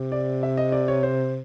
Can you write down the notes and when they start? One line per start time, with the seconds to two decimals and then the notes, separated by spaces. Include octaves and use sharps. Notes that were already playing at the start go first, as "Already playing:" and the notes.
Already playing: C3
0.12 D5
0.43 E5
0.57 D#5
0.72 D5
0.88 C#5
1.03 C5